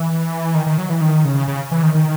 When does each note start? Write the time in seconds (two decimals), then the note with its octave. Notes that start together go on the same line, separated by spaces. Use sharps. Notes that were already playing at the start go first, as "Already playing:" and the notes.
Already playing: E3
0.55 D#3
0.66 D#3
0.78 F#3
0.90 E3
1.01 D#3
1.25 C#3
1.48 C#3
1.72 E3
1.83 D#3
1.95 D#3